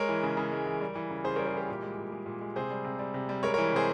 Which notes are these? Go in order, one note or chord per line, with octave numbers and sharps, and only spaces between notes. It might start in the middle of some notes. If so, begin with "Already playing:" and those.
Already playing: G#3 A#4 C#5
E3
C#3
C#3
G#3
E3
G3
E3
C#3
C#3 G#4 C5
G3 A#4 C#5
G#4 C5
E3 G4 A#4
A#2
G#3
A#2
G#3
A#2
G#3
C3 G#4 C5
G3
C3
G3
C3
G3
G#3 A#4 C#5
E3 A#4 C#5
C3 G#4 C5